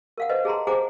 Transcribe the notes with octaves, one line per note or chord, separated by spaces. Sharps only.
A#4 F5 F#5
B4 C5 D#5 F#5
G#4 A5 A#5 C6
G#4 C5 F#5 G#5 A#5 D6